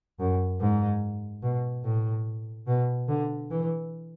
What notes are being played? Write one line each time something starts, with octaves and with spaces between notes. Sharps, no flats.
F#2
G#2
B2
A2
B2
D3
E3